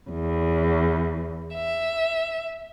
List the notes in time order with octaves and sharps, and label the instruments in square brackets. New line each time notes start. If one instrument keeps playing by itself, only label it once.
[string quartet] E2
E5